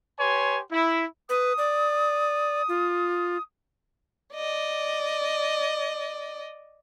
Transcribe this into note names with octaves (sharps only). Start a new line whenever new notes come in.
G4 B4 C#5 G#5 C6
E4
B4 D#6
D5
F4
D5 D#5